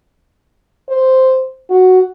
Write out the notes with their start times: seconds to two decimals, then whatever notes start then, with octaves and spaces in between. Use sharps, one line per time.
0.89 C5
1.70 F#4